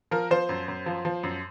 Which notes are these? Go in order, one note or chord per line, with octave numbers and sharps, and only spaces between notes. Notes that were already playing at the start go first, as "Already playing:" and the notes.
F3 A#4
F3 C5
F#2
F#2
F3
F3
F#2